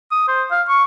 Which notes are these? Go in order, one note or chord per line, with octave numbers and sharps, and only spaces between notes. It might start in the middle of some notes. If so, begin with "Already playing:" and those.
D#6
C5
F5
C#6